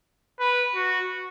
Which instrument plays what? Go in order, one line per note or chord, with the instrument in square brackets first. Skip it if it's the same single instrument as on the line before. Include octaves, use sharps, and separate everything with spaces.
[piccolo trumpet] B4
F#4